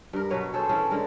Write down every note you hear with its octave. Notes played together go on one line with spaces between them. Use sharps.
G2 A#4
B2 F#3 B4 C#5
G#4 A4 C5 C#5
E3 C#4 A4
D3 G#3 A#4